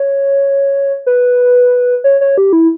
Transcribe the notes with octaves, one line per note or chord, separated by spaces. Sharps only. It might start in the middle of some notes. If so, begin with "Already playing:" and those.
Already playing: C#5
B4
C#5
C#5
G4
E4